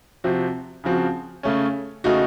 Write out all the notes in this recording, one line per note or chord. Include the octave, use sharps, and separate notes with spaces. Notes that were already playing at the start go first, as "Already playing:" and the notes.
C3 F3 C4 F#4
C#3 F3 C4 F#4
C#3 A3 C#4
C#3 A3 D#4 F#4